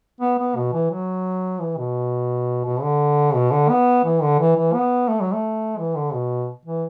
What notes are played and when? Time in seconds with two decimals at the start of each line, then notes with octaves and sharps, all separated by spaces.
0.21 B3
0.38 B3
0.56 B2
0.74 E3
0.91 F#3
1.61 E3
1.78 B2
2.65 B2
2.82 D3
3.35 B2
3.52 D3
3.70 B3
4.05 E3
4.22 D3
4.40 E3
4.57 E3
4.74 B3
5.09 A3
5.20 F#3
5.33 A3
5.78 E3
5.96 D3
6.14 B2
6.66 E3